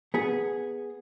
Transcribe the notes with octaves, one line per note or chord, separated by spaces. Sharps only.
B3 G#4